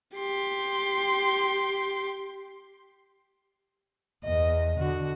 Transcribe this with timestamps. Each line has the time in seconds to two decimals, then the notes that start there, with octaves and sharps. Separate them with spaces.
0.16 G4 C6
4.25 E2 D#5
4.79 D3 F#4